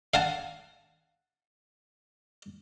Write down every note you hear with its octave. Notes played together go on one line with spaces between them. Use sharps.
F5 F#5 G#5 A5